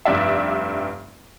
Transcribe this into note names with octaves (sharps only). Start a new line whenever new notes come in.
F1 G2 D5 E5